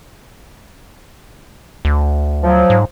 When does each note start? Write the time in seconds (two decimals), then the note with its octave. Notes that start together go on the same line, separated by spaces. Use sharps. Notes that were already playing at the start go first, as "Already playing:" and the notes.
1.85 D2
2.43 F3 F#3
2.70 G#2